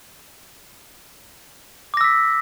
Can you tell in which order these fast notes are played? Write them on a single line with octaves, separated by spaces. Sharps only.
D6 A#6 E6 B6